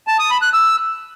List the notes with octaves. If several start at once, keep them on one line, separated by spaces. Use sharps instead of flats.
A5
D#6
B5
F#6
E6